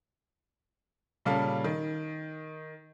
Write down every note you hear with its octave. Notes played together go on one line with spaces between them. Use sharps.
A#2 C#3 G3 C#4 A4 F5
D#3